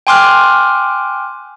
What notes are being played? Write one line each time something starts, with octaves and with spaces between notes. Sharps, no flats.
G5 G#5 C6 D6 F6 F#6